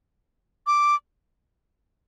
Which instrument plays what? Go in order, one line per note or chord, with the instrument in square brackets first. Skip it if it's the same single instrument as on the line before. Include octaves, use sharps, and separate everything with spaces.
[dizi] D6